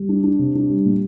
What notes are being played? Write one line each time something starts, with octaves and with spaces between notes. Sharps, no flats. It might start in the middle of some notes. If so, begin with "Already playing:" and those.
Already playing: G3
D4
D4
C3
D4
G3
A#2